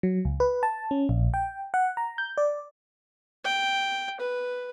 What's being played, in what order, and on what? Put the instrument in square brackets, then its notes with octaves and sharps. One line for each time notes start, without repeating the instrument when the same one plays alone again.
[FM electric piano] F#3
C#2
B4
A5
C#4
A#1
G5
F#5
A#5
G6
D5
[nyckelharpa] G5
B4